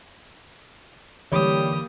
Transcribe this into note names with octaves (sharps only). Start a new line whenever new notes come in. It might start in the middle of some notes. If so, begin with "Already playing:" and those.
D3 E3 G3 A#3 G4 C#5 B5 D#6